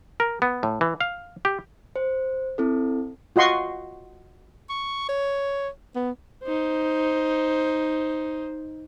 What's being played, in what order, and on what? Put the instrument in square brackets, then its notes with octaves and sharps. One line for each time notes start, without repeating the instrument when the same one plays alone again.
[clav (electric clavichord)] A#4
B3
A2
E3
F5
G4
[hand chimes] C5
C4 E4 A4
[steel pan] F4 F#4 D#5 C6 C#6
[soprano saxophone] C#6
C#5
B3
[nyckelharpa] D#4 C5